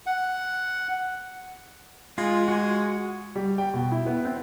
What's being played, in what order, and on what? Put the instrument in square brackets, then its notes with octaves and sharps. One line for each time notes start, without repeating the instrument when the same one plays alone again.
[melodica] F#5
[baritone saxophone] G#3 [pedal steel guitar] F4
[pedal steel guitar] F#4 G#5
[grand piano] G3
G5
B2
E4
B3
C4